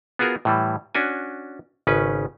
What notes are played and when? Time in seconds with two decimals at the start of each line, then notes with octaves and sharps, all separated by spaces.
0.19 B3 F4 F#4 G#4 A#4
0.45 A2 E3 G3
0.95 C#4 D4 F#4 G#5
1.87 G#1 C#3 C#4 B4